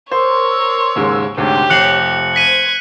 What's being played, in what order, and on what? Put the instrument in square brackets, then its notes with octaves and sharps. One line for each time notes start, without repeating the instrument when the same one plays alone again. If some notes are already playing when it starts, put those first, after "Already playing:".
[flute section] A#4 C6 E6 [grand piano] C5 [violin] C#5
[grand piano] D#2 G#2 C#3
[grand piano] D2 G#2 C3 [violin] G4 [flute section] C#5
[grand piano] F1 C7 [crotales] F#6 C#7 F#7
[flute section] C5 [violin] G#6 [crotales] B6 D#7